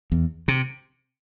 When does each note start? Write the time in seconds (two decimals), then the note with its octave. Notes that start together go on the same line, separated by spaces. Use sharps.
0.12 E2
0.48 C3